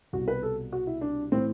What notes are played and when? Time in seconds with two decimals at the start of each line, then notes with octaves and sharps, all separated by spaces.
0.13 C2 B2 F#4
0.28 B4
0.43 A4
0.72 F#4
0.87 E4
1.01 D4
1.32 A2 E3 C4